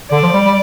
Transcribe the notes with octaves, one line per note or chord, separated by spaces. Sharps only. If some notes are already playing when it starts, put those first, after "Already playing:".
D3 D5
F3
G3
G3